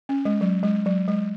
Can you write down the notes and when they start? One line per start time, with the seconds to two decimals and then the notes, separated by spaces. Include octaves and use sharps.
0.09 C#4
0.25 G#3
0.41 F#3
0.63 G#3
0.86 F#3
1.08 G#3